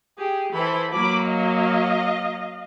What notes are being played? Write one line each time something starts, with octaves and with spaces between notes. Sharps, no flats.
G4 G#4
E3 A4 C5 B5
F#3 A#3 B5 D6
D#5 F5